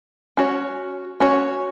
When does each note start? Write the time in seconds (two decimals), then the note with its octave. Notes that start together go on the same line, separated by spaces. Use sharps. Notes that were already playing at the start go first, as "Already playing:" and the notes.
0.37 C#4 F#4 C#5
1.20 C#4 F#4 C#5